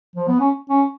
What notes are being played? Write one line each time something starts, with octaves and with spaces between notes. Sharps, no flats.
F3
B3
C#4
C#4